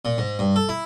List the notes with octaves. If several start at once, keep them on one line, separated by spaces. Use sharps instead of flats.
A#2
G#2
G2
A4
E4